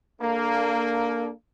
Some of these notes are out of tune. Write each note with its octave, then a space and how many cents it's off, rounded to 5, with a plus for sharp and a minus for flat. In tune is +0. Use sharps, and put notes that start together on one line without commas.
A#3 +0 D4 +0 A4 -25